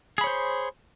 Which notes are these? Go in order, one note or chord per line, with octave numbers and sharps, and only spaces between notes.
G#4 C5 C#5 B5